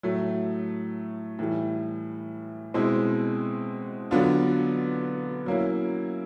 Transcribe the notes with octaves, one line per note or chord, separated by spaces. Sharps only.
A2 F#3 A3
A2 E3 G3
B2 G#3 C4 E4
D3 F#3 B3 D4 F4
F#3 A#3 C#4 E4